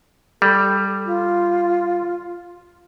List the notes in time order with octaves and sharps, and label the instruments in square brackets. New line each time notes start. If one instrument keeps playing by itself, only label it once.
[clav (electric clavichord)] G3 [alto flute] A4
[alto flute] F4